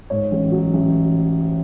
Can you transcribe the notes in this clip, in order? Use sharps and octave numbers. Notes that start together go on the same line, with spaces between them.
G#2 C#5
A1
F#3
A1